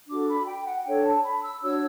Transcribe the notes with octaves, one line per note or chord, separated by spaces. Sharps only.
D4 F#4 A4 D6
B5
G5
F#5
D4 A4 C#5 G5
A5
B5
E6
D4 F#4 C#5 E6